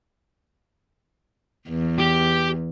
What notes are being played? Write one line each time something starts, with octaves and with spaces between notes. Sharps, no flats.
E2
G4